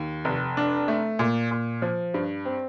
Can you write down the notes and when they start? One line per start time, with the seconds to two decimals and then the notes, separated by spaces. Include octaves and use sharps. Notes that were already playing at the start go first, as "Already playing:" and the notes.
Already playing: D#2
0.25 F1
0.57 D4
0.88 A3
1.19 A#2
1.51 A#2
1.82 F3
2.14 G2
2.45 C4